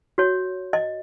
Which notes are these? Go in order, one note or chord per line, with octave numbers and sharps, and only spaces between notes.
F#4 C#5
D#5